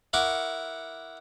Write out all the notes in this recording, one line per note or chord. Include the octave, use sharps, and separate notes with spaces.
E4 A#4 F#5 C#6 D6